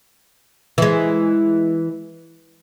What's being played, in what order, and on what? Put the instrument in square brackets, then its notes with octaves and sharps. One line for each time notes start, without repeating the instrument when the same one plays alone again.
[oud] E3 G#3